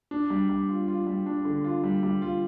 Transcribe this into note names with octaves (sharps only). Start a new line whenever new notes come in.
D4
G3
G3
F4
F4
G3
D4
D3
F4
G3
G3
F4